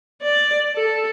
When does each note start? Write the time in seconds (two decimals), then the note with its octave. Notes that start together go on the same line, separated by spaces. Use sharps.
0.22 D5
0.75 A4